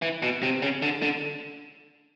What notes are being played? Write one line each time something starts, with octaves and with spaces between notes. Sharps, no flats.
E3
B2
C3
C#3
D3
D3